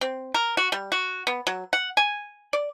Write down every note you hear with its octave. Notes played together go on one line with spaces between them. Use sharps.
C4
A#4
F#4
G3
F#4
B3
F#3
F#5
G#5
D5